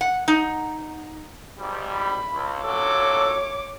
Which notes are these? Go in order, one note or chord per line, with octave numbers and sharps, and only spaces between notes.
F#5
D#4
G#1 G3
B5
C#2
A#2 F#3 A4 C#5 D6